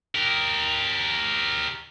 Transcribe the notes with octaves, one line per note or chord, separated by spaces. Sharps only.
G4 A#4